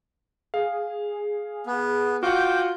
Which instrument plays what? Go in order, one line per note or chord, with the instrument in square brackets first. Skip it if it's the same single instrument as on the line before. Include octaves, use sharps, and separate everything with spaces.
[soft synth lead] G#4 [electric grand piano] F5
[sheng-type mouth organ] B3 [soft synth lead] G#4
[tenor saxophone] F4 [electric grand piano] F#4 F#5 [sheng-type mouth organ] G5 D6 [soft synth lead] G6